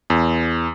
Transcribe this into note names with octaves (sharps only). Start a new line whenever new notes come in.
E2